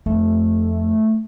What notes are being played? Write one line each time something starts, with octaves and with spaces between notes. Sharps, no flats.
F2 A3